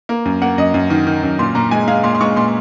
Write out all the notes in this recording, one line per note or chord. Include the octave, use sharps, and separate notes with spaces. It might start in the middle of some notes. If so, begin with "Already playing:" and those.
A#3
F#2
A#3 F#5
F#2 D#5
F#2
D#3
D#3
F#2
A#2 C6
A#2 A#5
G#3 G#5
G#3 F5
A#2 C6
C6
G#3 C#6
A#2 C6